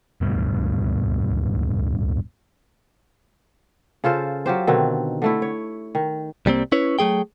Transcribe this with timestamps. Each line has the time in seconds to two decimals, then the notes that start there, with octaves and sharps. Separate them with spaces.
0.21 D1 C#2 G2 B2
4.04 C#3 F4 A4 C5
4.46 F#3 F4 G4 C5
4.67 B2 D3 D#3 C4
5.22 D3 A3 E4
5.42 C#5
5.95 D#3
6.46 C2 G3 A#3 C4
6.72 C#4 E4 B4 C#5
6.99 F#3 A3 G#4 G5